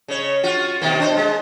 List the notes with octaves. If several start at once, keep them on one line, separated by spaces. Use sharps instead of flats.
C#3 C#5
F4 F#4
B2 D#3 A#3
D4 C5
G#3